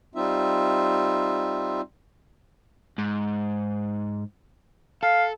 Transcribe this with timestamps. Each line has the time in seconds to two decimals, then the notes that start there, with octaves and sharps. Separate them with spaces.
0.15 G3 C4 D#4 F4 E5
2.98 G#2
5.03 A4 F5